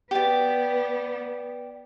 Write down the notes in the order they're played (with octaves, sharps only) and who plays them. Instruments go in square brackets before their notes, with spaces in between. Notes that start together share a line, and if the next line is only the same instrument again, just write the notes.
[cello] B3 [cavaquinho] G4 D5